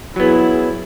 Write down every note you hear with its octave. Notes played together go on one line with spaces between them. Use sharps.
F#3 B3 E4 G#4